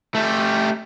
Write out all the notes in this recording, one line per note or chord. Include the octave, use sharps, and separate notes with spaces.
A3 G4